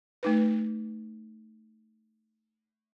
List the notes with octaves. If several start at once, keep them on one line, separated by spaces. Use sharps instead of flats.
A3 D#4 B4